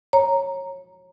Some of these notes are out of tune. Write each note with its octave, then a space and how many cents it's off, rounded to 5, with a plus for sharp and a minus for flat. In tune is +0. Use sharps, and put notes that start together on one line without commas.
C#5 -20 A#5 +0